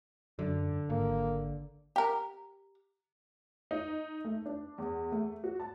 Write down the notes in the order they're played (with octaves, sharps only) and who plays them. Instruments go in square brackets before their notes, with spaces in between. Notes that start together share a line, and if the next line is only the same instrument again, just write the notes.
[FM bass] F#2 [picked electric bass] D3
[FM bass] G#1 [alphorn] A#3
[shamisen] G4 A#4
[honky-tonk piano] D#4
A3
D4
E2
A3
F#4
A5